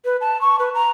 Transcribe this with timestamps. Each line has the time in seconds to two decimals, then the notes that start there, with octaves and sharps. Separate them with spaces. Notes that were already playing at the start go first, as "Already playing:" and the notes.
0.05 B4
0.21 A5
0.41 C#6
0.59 B4
0.74 A#5